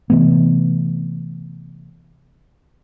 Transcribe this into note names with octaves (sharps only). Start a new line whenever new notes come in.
C3 E3 A3 B3